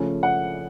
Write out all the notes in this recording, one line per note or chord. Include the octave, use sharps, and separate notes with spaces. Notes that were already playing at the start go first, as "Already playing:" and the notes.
Already playing: C#3 F3 A3 C#4
F#5